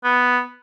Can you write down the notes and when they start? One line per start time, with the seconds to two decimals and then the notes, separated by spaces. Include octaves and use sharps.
0.04 B3